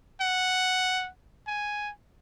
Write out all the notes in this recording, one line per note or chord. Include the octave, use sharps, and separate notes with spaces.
F#5
G#5